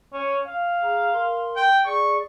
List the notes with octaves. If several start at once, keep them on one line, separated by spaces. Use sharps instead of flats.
C#4
F5
G#4 A#5
A#4 C6
G5
G#4 D5 C#6